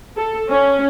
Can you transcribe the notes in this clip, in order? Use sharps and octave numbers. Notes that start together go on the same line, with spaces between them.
A4
C#4